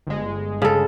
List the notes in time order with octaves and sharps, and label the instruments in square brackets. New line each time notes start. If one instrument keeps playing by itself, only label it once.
[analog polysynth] G1 G#3
[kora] C#3 A4